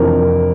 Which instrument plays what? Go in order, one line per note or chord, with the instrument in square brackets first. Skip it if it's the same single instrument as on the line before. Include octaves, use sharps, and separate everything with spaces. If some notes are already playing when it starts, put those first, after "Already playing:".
Already playing: [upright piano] F2 C3 E3 D4 A#4